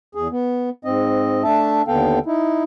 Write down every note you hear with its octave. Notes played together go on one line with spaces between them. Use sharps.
E2 G#4
B3
G#2 C4 D#5
A3 D4 E5 A5
D#2 D3 B3 A4 F5 G5
D#4 E4